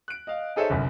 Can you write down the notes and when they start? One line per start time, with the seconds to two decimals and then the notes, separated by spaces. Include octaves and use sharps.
0.08 F#6 D7
0.27 D#5 F5
0.56 D#4 G#4 A4 C5 C#5 E5
0.70 G1 C2 F#2